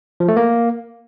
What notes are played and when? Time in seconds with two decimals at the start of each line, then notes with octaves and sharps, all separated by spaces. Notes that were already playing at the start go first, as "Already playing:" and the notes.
0.20 F3
0.28 A3
0.37 A#3